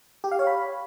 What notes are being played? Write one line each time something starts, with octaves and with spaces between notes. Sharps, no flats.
G4
F5
C#5
B5